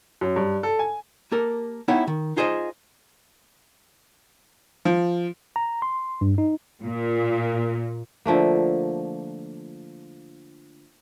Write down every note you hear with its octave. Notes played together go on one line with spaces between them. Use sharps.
F#2
G2
A4
G#5
A#3 G4 A4 A#4
B3 D#4 E4 G4 C#5 F#5
D#3
D#4 F4 G#4 C5 D5 D#5
F3
A#5
C6
G2
D#4
A#2
D3 F3 A3 A#3